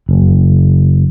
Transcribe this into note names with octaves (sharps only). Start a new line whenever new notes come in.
F#1